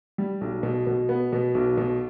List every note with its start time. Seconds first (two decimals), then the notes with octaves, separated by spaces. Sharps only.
0.18 G3
0.41 B1
0.63 B2
0.87 B2
1.09 B3
1.33 B2
1.55 B1
1.78 B2